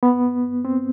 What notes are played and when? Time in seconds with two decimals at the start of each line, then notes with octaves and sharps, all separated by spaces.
0.03 B3
0.65 C4